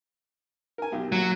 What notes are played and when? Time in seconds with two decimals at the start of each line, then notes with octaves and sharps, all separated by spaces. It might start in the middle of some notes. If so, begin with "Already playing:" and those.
0.78 A#4 G#5
0.92 B1 G4
1.12 A#2 F#3